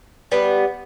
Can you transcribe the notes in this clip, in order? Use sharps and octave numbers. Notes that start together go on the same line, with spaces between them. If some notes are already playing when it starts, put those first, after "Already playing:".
G3 B3